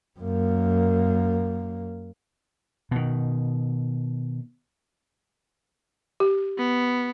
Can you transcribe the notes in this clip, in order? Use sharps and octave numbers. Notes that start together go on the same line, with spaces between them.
F#2 A#3
B2 D#3
G4
B3